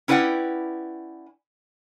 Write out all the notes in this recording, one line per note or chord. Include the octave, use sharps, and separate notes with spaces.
C#4 E4 B4 D5 F#5 G5